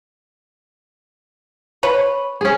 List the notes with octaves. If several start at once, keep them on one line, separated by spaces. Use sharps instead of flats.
B4 C#5
C#4 G#4